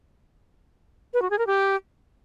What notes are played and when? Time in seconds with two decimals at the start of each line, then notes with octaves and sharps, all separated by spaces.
1.14 B4
1.22 F#4
1.30 G#4
1.39 A#4
1.47 G4